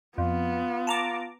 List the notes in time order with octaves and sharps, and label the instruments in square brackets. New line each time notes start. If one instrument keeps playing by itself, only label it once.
[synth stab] F2 [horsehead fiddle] B3 [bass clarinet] F4
[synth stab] A5 A#5 D6